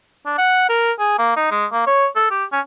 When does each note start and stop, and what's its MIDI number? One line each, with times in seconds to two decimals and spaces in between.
0.26 0.34 62
0.38 0.67 78
0.69 0.92 70
0.99 1.17 68
1.18 1.33 58
1.36 1.48 63
1.51 1.66 56
1.72 1.83 58
1.87 2.07 73
2.15 2.26 69
2.31 2.44 67
2.52 2.60 61